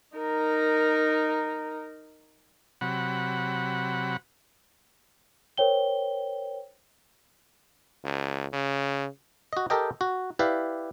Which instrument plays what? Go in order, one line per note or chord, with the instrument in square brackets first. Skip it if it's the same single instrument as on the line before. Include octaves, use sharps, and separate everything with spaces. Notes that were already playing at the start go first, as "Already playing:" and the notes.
[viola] D#4 A#4
[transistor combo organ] C3 F#3 F#5 B5
[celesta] A#4 C5 C#5 G5 G7
[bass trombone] C#2
C#3
[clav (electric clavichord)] F#4 D#5
G4 A4 A#4 D#5 G5
F#4
E4 G4 B4 D5 F5